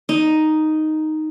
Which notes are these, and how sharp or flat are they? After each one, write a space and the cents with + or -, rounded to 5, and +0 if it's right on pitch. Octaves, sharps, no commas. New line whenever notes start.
D#4 +0